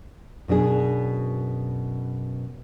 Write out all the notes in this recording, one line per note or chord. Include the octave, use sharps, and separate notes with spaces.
F#2 B2 D4 G#4